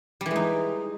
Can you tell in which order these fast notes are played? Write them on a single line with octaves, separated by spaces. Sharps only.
G3 E3 G#3 D#4